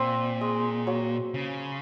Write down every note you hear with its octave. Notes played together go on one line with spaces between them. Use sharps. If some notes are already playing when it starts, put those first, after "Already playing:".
Already playing: A#2 C4
G#3
F#3
C#3